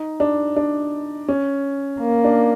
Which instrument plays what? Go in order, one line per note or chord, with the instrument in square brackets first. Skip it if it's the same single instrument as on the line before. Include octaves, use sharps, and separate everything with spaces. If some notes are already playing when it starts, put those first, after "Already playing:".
Already playing: [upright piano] D#4
D4
D4
C#4
[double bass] A#3
[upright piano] D4